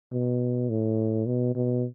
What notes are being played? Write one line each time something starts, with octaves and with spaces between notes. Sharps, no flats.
B2
A2
B2
B2